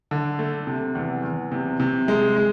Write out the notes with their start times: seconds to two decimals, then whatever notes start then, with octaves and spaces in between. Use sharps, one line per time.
0.11 D3
0.39 A3
0.67 C3
0.95 E2
1.23 E2
1.52 C3
1.80 C3
2.08 G#3
2.37 G#3